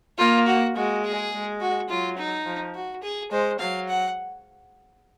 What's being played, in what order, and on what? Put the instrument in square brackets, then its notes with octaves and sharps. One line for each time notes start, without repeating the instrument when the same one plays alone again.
[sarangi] A#3 [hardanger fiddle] F4
[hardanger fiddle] F#4
[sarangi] G#3 [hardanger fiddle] F#4
[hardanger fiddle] G#4
[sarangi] G#3
[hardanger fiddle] F#4
[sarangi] F#3 [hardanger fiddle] F4
[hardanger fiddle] D#4
[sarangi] F3
[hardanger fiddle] F#4
G#4
[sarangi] G#3 [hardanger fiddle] C5
[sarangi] F#3 [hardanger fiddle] F5
[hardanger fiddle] F#5